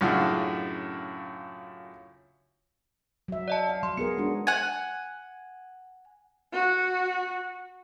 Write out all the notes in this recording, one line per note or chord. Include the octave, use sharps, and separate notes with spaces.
F#2 A2 C#3 D4 F4 F#4
F#3 E5
D5 D#5 A5
F5
F#3 C6
B3 G#4 A#4 C#7
G#3 D4 F#4
F#5 G#5
F#4